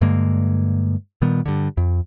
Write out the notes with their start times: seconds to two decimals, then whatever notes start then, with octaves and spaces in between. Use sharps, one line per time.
0.01 G2 D3 G#3 A#3
1.22 A#2 D#3 G3 B3
1.46 G2 D3
1.77 F2